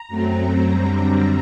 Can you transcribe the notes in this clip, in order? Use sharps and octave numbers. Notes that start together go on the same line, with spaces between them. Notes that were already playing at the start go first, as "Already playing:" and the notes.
Already playing: A#5
F#2 F#3 A3 C4
F#2 D3 G3 C4 A#5